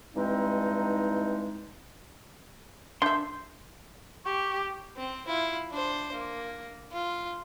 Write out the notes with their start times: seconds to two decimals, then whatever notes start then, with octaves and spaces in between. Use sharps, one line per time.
0.15 G2 E3 G#3 C4 D#4
3.02 D4 E5 C6 G6
4.25 G4 C#6
4.97 C4
5.27 E4 F4
5.71 D4 C5
6.12 A#3
6.92 F4